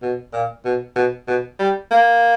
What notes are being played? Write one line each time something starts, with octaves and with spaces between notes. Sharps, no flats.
B2
A#2
B2
B2
B2
G3
A#3